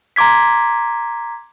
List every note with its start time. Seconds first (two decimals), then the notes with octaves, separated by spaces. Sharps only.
0.16 A#5 C6 D6 G#6 B6